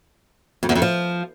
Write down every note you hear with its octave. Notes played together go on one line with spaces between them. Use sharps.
F2
E2
F2
F3